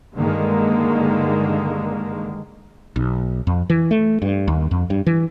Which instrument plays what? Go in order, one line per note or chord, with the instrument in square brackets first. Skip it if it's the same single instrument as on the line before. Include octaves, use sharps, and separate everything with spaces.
[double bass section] G2 D3 D#3 G#3 A#3
[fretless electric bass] B1
F2
E3
A3
G2
D#2
F2
G2
E3